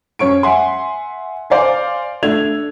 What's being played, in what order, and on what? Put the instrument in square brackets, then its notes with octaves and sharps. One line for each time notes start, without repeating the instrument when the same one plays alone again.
[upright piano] F#2 C#5 C#6 D7
E5 F#5 G#5 C6
C5 D5 F5 G#5
A3 D4 G#6 F7